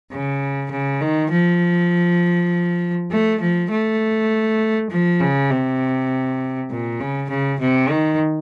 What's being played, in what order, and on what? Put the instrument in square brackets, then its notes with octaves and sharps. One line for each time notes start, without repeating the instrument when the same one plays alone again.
[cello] C#3
C#3
D#3
F3
A3
F3
A3
F3
C#3
C3
A#2
C#3
C#3
C3
D#3